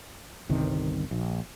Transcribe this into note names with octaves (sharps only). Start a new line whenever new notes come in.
G1 C2 C3 D#3
A#1